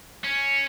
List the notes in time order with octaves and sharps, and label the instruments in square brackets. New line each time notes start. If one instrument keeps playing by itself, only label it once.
[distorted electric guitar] C#4